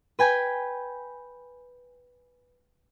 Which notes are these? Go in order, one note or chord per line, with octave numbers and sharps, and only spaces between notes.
B4 G5 G#5 B5